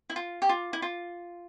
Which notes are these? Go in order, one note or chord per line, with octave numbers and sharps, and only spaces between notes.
E4
F4
G4
F4
E4
F4